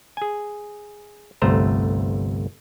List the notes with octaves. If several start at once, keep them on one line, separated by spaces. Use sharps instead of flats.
G#4 G#5
G1 C2 A3 C5 A#5